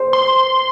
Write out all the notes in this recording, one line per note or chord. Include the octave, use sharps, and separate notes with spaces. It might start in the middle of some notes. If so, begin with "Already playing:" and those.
Already playing: C5
C6